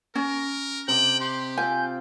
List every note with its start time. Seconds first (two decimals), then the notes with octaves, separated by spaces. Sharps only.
0.15 C#4 A#4
0.88 C3 D#5 G5 D6 F#7
1.20 G4 C6
1.58 C4 F4 G#5 G6